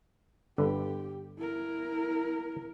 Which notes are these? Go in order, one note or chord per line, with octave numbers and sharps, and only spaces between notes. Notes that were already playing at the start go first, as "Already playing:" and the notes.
G1 D3 G4 B4
E4 A#4